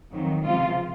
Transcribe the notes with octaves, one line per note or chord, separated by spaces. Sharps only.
F2 D#3 F#3
C#2 C3 F3 F4